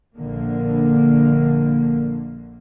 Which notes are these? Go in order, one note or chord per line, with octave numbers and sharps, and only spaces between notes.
A#1 D3 A#3